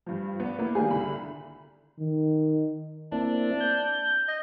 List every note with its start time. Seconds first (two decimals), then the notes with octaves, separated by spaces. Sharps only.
0.06 G2 F3
0.40 B3 D4
0.59 A#3 B3 E4
0.75 D#3 G3 A#3 D4 F4 G#4
0.91 C2 D3 B5
1.99 D#3
3.12 A#3 C4 D4 E4
3.61 G6
4.28 D#5